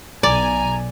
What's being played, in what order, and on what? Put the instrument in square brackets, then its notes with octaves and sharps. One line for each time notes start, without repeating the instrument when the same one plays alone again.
[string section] B1 G#5 [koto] D5 [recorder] A#5